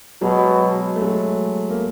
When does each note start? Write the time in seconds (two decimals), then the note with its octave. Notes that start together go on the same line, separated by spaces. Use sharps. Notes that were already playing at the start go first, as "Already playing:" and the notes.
0.21 B2 F#3 G#3
0.96 A3
1.01 F#3 G#3
1.70 A#3